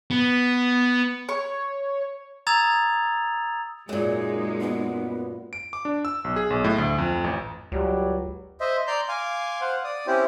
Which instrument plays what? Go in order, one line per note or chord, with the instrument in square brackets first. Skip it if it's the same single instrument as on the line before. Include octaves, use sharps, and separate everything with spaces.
[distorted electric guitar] B3
[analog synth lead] C#5 [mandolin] C#6
[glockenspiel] A#5 D#6 E6 G#6 A6 F7
[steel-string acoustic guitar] F#2 A#2 [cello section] G#3 D#4 [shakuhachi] G#4
[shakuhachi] B3
[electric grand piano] D7
D6
D4
E6
B1
G#4
B1
A2
D2
F2
A1
[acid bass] C#2 [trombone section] F#3 G3
[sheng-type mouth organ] C5 D#5 E5
D5 A#5 C6 G6
F5 G#5 C6 D6
C5 F5 F#5
D5 D#6
C4 C#4 E4 G4 C5